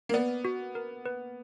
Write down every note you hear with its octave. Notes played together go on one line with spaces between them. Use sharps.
A#3
B3 D5
F#4
A#4
B4